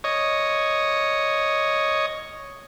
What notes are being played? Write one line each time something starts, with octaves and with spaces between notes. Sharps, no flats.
C#5 D#5